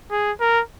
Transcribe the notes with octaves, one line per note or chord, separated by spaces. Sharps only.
G#4
A#4